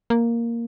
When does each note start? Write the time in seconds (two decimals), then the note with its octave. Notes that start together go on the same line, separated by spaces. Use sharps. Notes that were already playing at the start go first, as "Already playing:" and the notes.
0.10 A#3